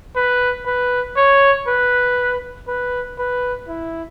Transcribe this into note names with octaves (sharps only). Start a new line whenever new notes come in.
B4
B4
C#5
B4
B4
B4
E4